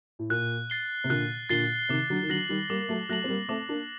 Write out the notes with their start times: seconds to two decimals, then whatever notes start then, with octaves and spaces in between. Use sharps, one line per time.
0.19 A2
0.30 A#2 F#6
0.70 A6 C7 G7
1.04 C3
1.09 A#2 D3 F#6
1.49 A#2 D3 A6 C7 G7
1.89 C3 D#3 D6
2.10 D3 F#3
2.23 D#3
2.29 D3 F#3 F#6 A#6 F#7
2.49 D#3 G3
2.69 G3 A#3 D6
2.80 A#3
2.89 F#3 A3
3.09 F#3 A3 F#6 A#6 F#7
3.24 C4
3.29 G3 A#3
3.49 A3 C4 D6
3.69 A#3 D4